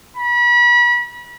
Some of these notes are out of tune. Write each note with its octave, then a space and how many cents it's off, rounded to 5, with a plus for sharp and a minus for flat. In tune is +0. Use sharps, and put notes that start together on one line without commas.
B5 -35